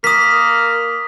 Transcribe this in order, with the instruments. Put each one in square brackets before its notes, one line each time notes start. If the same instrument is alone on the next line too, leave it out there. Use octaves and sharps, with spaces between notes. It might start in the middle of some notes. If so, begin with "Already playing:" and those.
[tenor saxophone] A#3 [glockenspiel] D#6 B6